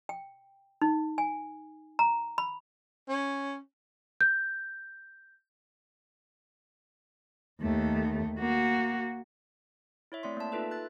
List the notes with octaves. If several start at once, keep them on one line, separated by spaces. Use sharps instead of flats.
G5
D#4
G#5
A#5
B5
C#4
G6
D#2 A3
A#3 F#4
E4 C#5 E5
A3 C4 D5 C6
A#3 A5
D#4 F4 A4 B4 E5
F#6 A6